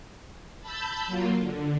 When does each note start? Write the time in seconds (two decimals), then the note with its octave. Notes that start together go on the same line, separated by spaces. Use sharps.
0.61 A5 B5 E6 G6
1.07 F#3 A#3 F4
1.38 D3